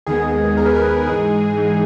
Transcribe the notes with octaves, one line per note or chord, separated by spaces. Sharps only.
D#2 D#3 G#3 B3 G#4
D#2 D#3 G#3 B3 A#4
B4
A#4
G#2 E3 G#3 D#4 G#4
G#2 E3 G#3 D#4